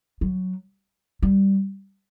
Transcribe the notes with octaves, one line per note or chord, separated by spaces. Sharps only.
F#3
G3